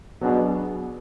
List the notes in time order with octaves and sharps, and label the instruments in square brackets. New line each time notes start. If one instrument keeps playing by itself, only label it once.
[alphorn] B2 [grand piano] F#3 B3 D4 G#4